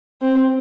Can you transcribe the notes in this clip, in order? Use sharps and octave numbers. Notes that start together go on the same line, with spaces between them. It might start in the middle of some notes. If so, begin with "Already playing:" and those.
C4